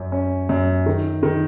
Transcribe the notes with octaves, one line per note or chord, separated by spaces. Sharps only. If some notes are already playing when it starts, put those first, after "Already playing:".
Already playing: F#2 C#4
C#4
F#2
D#3
D#3